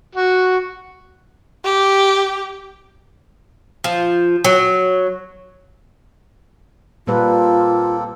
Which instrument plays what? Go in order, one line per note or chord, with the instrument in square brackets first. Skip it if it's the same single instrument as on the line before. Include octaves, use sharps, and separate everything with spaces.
[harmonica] F#4
[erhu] G4
[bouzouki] F3
F#3
[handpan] A#2 G3 B4 [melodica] A#3 C4 A4 [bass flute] F4